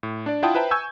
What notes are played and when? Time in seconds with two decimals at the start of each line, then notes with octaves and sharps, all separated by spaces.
0.03 A2
0.26 D4 D5
0.43 E4 F4 F#5 G5 A5 D#6
0.55 B4 C5 E5 G5 A5 A#5
0.71 G#5 C#6 E6 G6 G#6